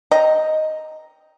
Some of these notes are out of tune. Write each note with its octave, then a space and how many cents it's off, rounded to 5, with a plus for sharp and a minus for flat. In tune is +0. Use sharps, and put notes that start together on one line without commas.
D#5 +0 G5 +0 A#5 +0